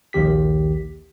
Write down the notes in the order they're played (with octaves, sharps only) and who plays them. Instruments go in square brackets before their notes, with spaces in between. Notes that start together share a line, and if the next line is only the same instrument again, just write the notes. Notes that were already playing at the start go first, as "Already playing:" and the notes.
[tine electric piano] A#1 D#2 D#3 G4 B6